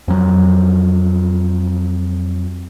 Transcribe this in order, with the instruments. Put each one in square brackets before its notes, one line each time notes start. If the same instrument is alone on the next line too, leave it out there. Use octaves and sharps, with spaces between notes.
[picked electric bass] F2 F#3